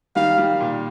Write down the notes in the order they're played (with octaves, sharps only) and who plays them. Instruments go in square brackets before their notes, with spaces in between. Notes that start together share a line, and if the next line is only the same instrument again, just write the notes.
[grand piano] D#3 G3 [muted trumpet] F5
[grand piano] D#3 G3
A#2